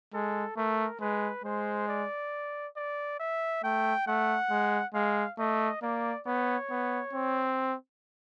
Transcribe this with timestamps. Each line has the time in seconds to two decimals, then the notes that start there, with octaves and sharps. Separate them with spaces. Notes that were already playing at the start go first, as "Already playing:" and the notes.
0.13 G#3 A4
0.57 A3 A#4
1.01 G#3 B4
1.44 G#3 C5
1.88 D5
2.76 D5
3.20 E5
3.64 A3 G5
4.07 A3 F#5
4.50 G#3
4.94 G#3 F5
5.39 A3 D#5
5.82 A#3 D5
6.26 B3 C#5
6.70 B3
7.14 C4